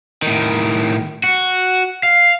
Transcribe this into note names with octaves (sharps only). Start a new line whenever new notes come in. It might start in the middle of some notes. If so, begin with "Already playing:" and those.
A2 D#3
F#4
F5